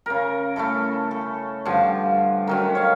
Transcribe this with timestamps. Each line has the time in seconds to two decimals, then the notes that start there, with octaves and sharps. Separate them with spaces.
0.06 C#3 A#4
0.56 A3 C#4 E4 A4
1.11 A4
1.65 G2 D3 F3
2.47 D#3 F#3 C#4
2.75 C#5 F5